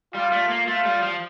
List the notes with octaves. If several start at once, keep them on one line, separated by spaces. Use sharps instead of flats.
G3 F4
A3
A#3
A3 F4
G3
F3